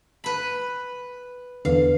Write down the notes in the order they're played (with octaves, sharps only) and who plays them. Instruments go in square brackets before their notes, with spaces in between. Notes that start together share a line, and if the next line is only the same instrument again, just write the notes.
[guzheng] B4 B5
[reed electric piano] E2 D3 [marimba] B4 [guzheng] F5